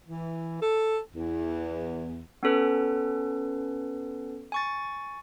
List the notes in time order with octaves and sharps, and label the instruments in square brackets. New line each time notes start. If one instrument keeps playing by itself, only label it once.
[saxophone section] E3
A4
E2
[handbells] B3 C#4 A4 B4
G#5 C#6 A6